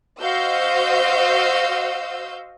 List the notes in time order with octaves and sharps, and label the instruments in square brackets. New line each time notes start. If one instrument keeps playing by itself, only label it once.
[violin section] F#4 C5 D#5 F5 E6 G6